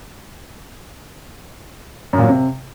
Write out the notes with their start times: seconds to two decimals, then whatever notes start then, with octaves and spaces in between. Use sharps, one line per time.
2.13 F#2
2.18 A#2
2.24 F#3
2.29 C3